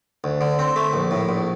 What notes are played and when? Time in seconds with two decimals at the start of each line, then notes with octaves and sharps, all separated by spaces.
0.24 D2
0.41 D3
0.59 C4
0.76 A3
0.93 A#1
1.11 A2
1.29 A#1